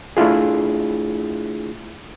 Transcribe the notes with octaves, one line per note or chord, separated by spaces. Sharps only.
A3 D4 E4 F4 G#4